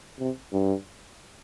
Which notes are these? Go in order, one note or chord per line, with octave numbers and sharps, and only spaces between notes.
C3
G2